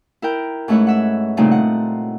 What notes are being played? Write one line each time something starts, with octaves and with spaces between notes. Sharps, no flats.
E4 A#4 G5
G#2 A3 C#4 E4 B4 C#5
E5 F#5
G2 A#2 C#3 A3 C4 D#4
F#5